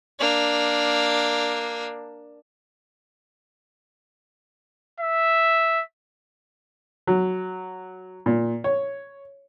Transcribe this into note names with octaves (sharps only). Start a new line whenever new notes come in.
A#3 D4
E5
F#3
A#2
C#5